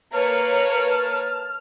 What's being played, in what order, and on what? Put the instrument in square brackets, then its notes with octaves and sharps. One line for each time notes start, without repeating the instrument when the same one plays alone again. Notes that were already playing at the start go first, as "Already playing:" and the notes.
[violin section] A#3 B4 C#5 [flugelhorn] A5 [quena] F6